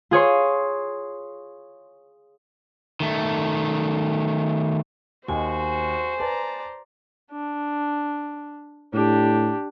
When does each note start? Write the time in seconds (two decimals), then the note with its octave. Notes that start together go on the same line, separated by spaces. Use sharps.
0.11 F4 G#4 C#5 C6
3.00 D#3 A3
5.28 D#2 F#4 C5 D#5 G#5
6.20 B4 D5 A5 A#5
7.31 D4
8.93 A2 D4 G4